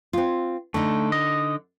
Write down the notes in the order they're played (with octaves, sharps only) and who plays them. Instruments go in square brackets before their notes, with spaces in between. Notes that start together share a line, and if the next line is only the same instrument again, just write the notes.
[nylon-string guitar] C4 F4
[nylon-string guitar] D3 D#4 [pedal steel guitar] A3
[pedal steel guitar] D#5